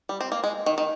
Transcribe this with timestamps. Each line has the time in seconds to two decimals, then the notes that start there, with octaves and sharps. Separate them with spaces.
0.09 G3
0.21 C4
0.32 A#3
0.44 G#3
0.66 D#3
0.78 D#3